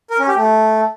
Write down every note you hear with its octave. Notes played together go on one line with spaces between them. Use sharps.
A#4
C#4
G4
A3